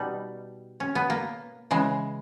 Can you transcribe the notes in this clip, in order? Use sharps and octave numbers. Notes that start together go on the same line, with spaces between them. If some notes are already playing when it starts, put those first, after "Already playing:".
Already playing: B2 G3 D#4
C#4
B3
A#3
C#3 E3 G#3